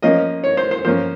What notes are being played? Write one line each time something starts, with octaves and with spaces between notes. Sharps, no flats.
F3 A#3 C#4 D#5
C#5
C5
C5
F3 A#3 C#4 C5